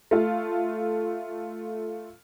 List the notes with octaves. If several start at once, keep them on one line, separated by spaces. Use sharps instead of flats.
A3 F4